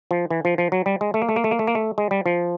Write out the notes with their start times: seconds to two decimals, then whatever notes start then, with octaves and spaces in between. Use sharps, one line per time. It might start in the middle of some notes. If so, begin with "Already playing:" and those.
0.11 F3
0.31 E3
0.45 F3
0.58 F3
0.72 F#3
0.86 G3
1.01 G#3
1.14 A3
1.22 A#3
1.29 A3
1.36 A#3
1.44 A3
1.51 A#3
1.59 A3
1.67 A#3
1.75 A3
1.98 G#3
2.11 G3
2.26 F3